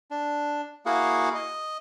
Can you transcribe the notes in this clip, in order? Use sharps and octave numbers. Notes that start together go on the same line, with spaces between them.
D4
A#3 E4 F#4 G#4 F5 F#5
D#5